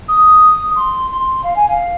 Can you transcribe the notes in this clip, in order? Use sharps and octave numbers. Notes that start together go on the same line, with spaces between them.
D#6
C6
C6
F5
G#5
F5